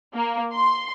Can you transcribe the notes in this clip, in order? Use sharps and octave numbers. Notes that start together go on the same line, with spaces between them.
A#3
C6